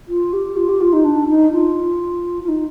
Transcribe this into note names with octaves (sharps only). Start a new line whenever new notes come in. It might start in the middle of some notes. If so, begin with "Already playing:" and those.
F4
G4
F4
G4
F4
D#4
D4
D#4
F4
F4
D#4